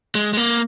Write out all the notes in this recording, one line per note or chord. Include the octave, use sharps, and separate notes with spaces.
G#3
G#3
A#3